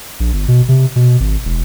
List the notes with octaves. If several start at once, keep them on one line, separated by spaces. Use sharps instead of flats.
A#1
G1
B2
C3
B2
G#1
E1